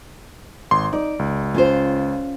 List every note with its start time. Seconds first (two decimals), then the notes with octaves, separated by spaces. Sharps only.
0.71 G#1 C6
0.93 D#4 D5
1.19 C#2
1.54 C#4 F4 C5